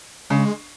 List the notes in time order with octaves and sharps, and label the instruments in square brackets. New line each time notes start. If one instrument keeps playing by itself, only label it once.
[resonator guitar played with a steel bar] C#3 [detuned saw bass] G#3